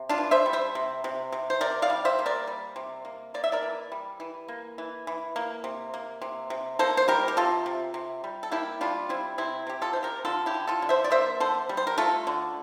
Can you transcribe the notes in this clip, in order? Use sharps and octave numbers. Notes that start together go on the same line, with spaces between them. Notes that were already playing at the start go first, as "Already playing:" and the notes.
Already playing: C3
D4 F4
E3
C5 E5
G3
C5 E5
C3
C3
C3
C5
C3 A#4 D5
D5 F5
G3
C5 E5
A#3
A#4 D5
G3
C3
A#3
A#3 D5
E5
A#4 D5
E3
G3
E3
A#3
E3
E3
A#3
C3
A#3
C3
C3
A#3 A4 C5
C5
G3 G4 A#4
G4
C3 F4 A4
C3
C3
G3
A4
A#3 E4 G4
G3 D4 F4
G3 C4 E4
C3 C4 E4
C3 G4
F4 A4
E3 C5
G4 A#4
D3 F4 A4
E4 G4
D3
F4 A4
D3
C5 E5
D5
A#3 C5 E5
D3 A4 C5
G3
C5
A#4
A3 F4 A4
D3